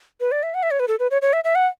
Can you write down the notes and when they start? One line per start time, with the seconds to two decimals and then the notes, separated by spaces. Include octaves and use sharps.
0.20 B4
0.32 D5
0.43 E5
0.54 F#5
0.63 E5
0.71 C#5
0.80 B4
0.88 A4
0.99 B4
1.11 C#5
1.22 C#5
1.33 E5
1.44 E5
1.55 F#5